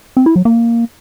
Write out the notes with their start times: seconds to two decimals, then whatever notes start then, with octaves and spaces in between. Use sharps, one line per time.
0.17 C4
0.26 E4
0.36 F#3
0.45 A#3